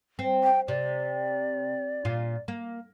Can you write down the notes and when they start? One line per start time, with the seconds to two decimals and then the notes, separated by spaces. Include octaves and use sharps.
0.19 C4
0.44 G5
0.68 C3 D5
2.05 A#2 F4
2.48 A#3